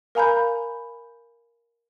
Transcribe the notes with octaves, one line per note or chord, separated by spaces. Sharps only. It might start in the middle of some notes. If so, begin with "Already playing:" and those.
A#4 F5 G#5 A#5 B5 G6